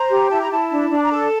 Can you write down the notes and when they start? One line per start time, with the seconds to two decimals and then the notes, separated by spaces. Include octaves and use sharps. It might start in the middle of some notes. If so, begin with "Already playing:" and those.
Already playing: C5 A#5
0.10 G4
0.30 E4 A5
0.40 A#5
0.50 E4 A5
0.71 D4
0.90 D4
1.02 A#5
1.11 A4 A5